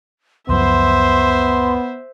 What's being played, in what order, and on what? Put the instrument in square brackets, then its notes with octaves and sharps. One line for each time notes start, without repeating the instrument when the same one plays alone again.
[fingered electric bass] C#2 F#2 F3 [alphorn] B3 [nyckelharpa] C5 E5 [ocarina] C6